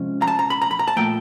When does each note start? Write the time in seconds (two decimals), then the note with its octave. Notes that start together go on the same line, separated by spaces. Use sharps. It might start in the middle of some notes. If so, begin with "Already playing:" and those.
Already playing: C3 F3 G#3 C#4
0.22 A#5
0.27 A5
0.39 A#5
0.50 B5
0.62 A#5
0.71 B5
0.79 A#5
0.88 A5
0.96 A#2 F3 A3 G5